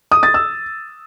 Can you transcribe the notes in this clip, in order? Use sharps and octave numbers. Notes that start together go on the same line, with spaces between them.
D#6
A6
E6